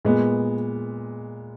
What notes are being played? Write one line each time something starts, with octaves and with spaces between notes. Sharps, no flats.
A#2 G#3 B3